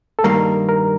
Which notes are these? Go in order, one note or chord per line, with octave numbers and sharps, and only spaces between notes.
A4
G2 D#3 G3 A#3 A#4
A#4